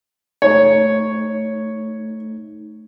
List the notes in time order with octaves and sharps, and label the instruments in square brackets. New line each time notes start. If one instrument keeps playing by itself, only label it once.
[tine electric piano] A3 D#4 [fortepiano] C#5